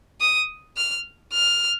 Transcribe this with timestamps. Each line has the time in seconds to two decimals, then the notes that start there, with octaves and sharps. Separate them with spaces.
0.21 D#6
0.77 F6
1.33 F6